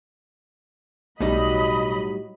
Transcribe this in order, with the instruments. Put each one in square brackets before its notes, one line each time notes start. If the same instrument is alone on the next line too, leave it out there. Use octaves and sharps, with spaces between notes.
[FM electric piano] B1 [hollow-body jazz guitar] A2 G3 D#4 [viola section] F#3 D#5 B5